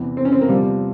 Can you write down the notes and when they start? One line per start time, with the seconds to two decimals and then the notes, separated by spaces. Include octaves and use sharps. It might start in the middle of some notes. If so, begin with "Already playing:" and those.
Already playing: E2 C3 E3
0.17 C4
0.25 C#4
0.32 C4
0.41 A#3
0.49 E2 C3 F3 G3